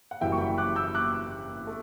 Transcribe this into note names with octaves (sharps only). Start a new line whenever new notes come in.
F#5
F#1 F#2 E3 G3 E5 G5
C#6
G5 B5
D6 F#6
E6 G6
D6 F#6
A3